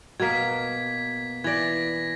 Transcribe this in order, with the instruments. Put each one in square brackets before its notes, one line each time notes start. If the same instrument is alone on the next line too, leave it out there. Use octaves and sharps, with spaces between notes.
[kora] B2 A#3 [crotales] G#6 B6
[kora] E3 D5 [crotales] G#6 A#6